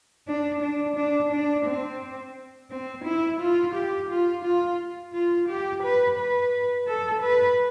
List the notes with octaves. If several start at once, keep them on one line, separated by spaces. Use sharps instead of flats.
D4
D4
D4
D4
C4
C4
E4
F4
G4
F4
F4
F4
G4
B4
B4
A4
B4